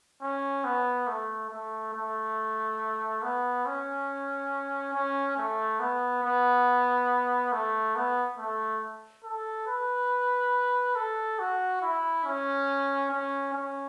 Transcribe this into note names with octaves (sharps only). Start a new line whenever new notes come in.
C#4
B3
A3
A3
A3
B3
C#4
C#4
A3
B3
B3
A3
B3
A3
A4
B4
A4
F#4
E4
C#4
C#4
C#4